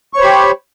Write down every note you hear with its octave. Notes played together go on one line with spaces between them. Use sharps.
G4 C5 C#5 B5 C#6